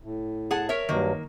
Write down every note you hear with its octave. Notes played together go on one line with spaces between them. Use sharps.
A2
G#4 F#5 A5
A#4 C#5 E5
G2 D#3 F#3 A#3